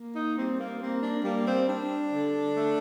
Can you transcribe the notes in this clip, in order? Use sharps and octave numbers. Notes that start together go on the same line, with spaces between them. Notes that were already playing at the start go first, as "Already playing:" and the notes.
Already playing: A#3
D#4
G3 C4
A#3
A#3 C4
D4
G3 A#3
C4
G3 D4
D3
A3